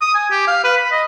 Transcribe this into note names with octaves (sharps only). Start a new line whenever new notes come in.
D#6
G#5
G4
F5
B4
B5
D#5